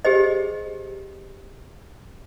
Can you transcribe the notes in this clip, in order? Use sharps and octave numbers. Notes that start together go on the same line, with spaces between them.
G4 G#4 C5 D#5